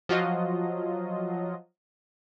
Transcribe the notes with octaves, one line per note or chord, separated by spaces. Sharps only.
F3 F#3 F4 D#5